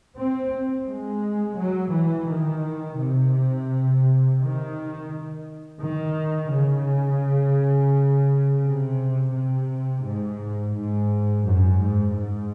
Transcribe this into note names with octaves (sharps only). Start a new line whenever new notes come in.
C4
G#3
F#3
E3
D#3
C3
D#3
D#3
C#3
C3
C3
G#2
G#2
F#2
G#2
G#2